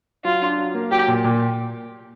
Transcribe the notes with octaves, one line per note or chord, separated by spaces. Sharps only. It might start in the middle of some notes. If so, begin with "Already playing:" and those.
F#3 F4
D4
F#3
A#3
F#3 G4
A#2
A#2